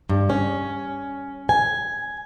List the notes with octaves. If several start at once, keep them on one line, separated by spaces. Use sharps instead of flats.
G2
C#4
G#5